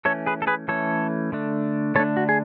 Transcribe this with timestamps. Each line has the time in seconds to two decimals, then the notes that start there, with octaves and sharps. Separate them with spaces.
0.05 E3 A3 C#4 A4 C#5
0.26 G#4 B4
0.42 A4
0.47 G#4 B4
0.68 E3 A3 C#4 A4 C#5
1.32 D3 A3 D4
1.95 D3 A3 D4 A4 C#5
2.17 F#4
2.29 G#4